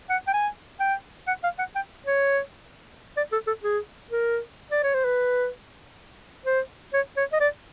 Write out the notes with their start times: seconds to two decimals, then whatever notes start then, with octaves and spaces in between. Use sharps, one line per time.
0.10 F#5
0.27 G5
0.34 G#5
0.80 G5
1.28 F#5
1.44 F5
1.59 F#5
1.75 G5
2.06 C#5
3.17 D5
3.32 A4
3.47 A4
3.64 G#4
4.11 A#4
4.71 D5
4.83 C#5
4.94 C5
5.05 B4
6.46 C5
6.93 C#5
7.17 C#5
7.32 D#5
7.41 D5